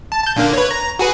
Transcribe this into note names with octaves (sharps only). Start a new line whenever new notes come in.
A5
A5 G6
A#2 D3 A#3
B4 C#5
A#5
F#4 G#4 B4